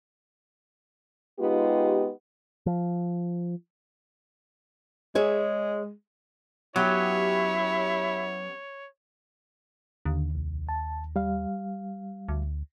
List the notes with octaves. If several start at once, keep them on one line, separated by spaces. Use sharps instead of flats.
G#3 B3 D#4 F4 G4
F3
G#3 G#4 C#5 E5
F#3 B3 C#4 E4 G4 C#5
D#2 D3
C2
A5
G3 F5
D2